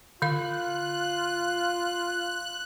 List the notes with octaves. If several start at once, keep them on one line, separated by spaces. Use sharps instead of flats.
D3 F4 F5 F#6